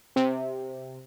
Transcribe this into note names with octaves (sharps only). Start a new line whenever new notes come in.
C3